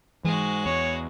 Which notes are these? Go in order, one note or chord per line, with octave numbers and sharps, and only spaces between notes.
G#2 E3 G#3 F#4
E2 C#5